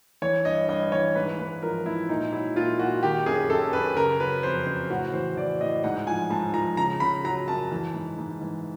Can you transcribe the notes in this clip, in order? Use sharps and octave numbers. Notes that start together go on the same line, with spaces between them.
E3 C#5
G2 D#5
G2 D#5
E3 C#5
G#2 B4
G#2 B4
F3 A#4
G#2 E4
A#2 D#4
F#3 E4
A#2 F4
A#2 F#4
D#3 G4
F#2 G#4
F#2 A4
F#2 B4
C#3 A#4
F#3 B4
F2 C5
C#3 C5
A2 F#4
E3 C5
E3 D5
A2 D#5
G#2 F#5
F3 G#5
G#2 A5
F3 A#5
C#3 A#5
C#3 B5
F#3 A#5
F#2 A5
E3
G#2
G#2
E3